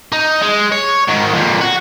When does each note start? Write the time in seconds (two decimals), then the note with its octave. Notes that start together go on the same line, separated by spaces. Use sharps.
0.12 D#4
0.42 G#3
0.72 C#5
1.08 G#2 D#3
1.33 F2 A#2
1.61 F#4